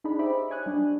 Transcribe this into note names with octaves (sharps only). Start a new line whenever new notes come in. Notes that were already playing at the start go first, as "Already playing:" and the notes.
D4 D#4 G#4 B5
G4 C5 D#5 E5 B5 D6
C#5 G#5 D#6 F#6
G3 D4